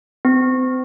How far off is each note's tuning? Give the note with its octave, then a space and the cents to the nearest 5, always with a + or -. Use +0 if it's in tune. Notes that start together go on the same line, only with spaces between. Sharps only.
C4 -35